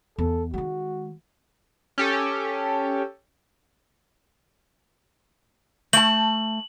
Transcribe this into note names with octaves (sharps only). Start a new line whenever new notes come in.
E2 A4
D#3 G#3 F#4
C#4 G4 A4
A3 A5 F#7